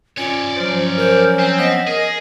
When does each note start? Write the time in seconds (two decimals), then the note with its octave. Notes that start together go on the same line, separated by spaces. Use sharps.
0.18 C#4 F4 C#5 D5
0.56 F3 F#3 C#4 C5
0.98 A#4 C5
1.39 C4 G#5
1.58 B3 D#5
1.87 G#4 A#4